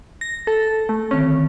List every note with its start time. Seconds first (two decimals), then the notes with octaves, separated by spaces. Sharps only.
0.21 A#6
0.47 A4
0.89 A3
1.11 D3 D#3 C4 C#4